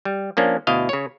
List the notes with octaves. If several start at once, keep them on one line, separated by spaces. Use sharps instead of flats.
G3
F3 A#3 C#4 D4
D2 B2 E4 D#5 F5
C#3 C#5